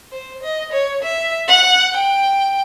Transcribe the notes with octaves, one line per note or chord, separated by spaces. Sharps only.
C5
D#5
C#5
E5
F#5
G5